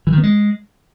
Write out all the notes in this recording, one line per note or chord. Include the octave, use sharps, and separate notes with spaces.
E3
D#3
B3
G#3